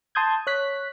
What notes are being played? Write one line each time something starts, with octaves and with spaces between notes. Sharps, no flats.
A5 C6 D#6 G6 G#6
C#5 F#6 B6